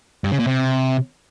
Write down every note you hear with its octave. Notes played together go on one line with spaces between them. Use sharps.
G2
C#3
A#2
C3